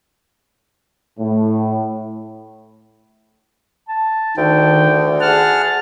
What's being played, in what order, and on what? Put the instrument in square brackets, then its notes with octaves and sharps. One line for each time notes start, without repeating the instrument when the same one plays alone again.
[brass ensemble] A2
[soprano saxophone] A5
[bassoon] D2 [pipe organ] D#3 [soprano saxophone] G5
[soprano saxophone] G#4 [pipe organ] F#5 A5 F6